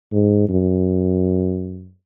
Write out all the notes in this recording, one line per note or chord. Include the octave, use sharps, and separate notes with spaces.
G#2
F#2